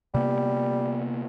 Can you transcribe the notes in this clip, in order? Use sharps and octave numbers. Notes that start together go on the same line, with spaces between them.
C3 G3 A#3 B3